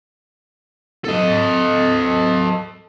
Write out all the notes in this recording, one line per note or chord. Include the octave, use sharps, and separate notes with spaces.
A4 D#5